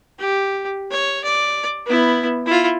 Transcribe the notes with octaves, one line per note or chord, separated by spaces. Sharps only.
G4
C#5
D5
B3 E4
E4 F4